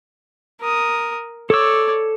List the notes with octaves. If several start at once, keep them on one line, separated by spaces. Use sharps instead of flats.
A#4 D#6
A4 C#5 D5 E6